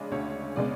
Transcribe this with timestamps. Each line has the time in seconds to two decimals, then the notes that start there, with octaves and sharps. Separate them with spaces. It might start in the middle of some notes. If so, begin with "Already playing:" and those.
Already playing: C#3 G#3 D4 C#5
0.11 D2 C#5
0.56 C#3 G#3 B3 D5